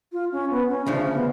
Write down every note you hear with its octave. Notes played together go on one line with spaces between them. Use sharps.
F4
C#4
B3
C#4
D2 C#3 F3 D4
B3